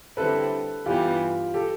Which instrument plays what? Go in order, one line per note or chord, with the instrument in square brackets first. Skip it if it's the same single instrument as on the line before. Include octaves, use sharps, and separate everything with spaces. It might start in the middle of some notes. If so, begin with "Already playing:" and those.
[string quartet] D3 G3 C4 E4 [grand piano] A4 B4
[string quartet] G2 E3 G3 B3 [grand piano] F4 G4
[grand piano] G4 A4